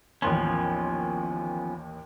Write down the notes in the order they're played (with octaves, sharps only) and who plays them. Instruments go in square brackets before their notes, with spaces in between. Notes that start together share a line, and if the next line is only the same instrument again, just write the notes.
[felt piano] A1 D#2 C6 [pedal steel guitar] F3 B3 C#4